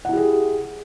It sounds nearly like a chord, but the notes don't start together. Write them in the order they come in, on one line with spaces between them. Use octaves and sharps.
F#5 E4 G4 G#4